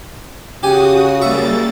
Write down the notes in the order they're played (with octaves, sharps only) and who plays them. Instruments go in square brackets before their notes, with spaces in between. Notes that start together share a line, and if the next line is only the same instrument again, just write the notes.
[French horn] C#3 [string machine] F#4 D#6 [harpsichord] G4 G#5
[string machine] G3 A#3 A6 [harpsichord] E5 C#6